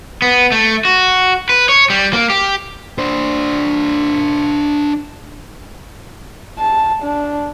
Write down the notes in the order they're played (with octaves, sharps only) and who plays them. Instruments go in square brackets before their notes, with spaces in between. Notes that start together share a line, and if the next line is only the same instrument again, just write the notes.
[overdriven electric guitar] B3
A3
F#4
B4
C#5
G3
A#3
G4
[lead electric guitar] D4 C5
[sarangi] A5
D4